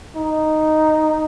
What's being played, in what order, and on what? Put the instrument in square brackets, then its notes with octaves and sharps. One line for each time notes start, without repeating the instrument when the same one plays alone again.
[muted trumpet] D#4